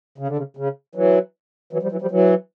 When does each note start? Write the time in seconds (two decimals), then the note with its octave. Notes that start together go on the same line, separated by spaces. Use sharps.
0.18 C#3
0.28 D3
0.37 C#3
0.57 C#3
0.95 E3 F#3
1.73 E3 F#3
1.82 F3 G3
1.91 E3 F#3
2.02 F3 G3
2.11 E3 F#3